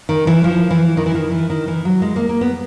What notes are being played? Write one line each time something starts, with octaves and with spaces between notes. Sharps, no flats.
D#3
E3
F3
E3
D#3
E3
D#3
E3
D#3
E3
F#3
G#3
A#3
A#3
B3